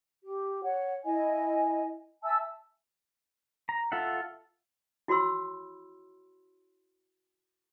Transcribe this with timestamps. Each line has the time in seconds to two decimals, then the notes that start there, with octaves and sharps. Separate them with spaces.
0.24 G4
0.62 C#5 F#5
1.05 E4 D#5 G#5
2.23 E5 G#5 A5 E6
3.69 A#5
3.92 F4 A4 E5 F#5
5.08 E4 F#4 C#5 B5 C6 E6